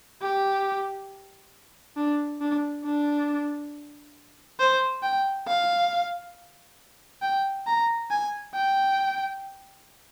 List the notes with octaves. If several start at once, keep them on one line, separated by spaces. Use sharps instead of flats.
G4
D4
D4
D4
C5
G5
F5
G5
A#5
G#5
G5